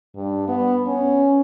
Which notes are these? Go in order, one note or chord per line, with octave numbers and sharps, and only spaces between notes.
G2
B3
C#4